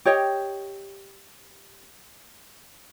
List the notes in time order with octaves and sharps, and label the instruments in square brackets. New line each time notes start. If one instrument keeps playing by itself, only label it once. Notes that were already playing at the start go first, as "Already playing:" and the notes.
[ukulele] G4 C#5 D#5 G5